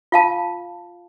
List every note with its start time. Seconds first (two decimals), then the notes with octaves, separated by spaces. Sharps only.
0.12 F4 F5 A5